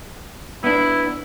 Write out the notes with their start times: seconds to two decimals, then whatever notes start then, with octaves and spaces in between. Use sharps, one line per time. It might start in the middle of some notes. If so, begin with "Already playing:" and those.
0.64 B3 D4 E4